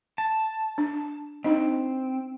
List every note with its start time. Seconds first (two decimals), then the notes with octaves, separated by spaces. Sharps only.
0.18 A5
0.78 D4
1.44 C4 D4 D#4 D#5